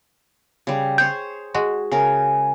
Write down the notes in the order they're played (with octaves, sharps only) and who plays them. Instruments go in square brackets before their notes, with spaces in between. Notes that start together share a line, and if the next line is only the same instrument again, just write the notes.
[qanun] C#3 G3
[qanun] G#4 C5 C#5 [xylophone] G6
[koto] G#3 F#4
[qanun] C#3 A#4 [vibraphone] G#5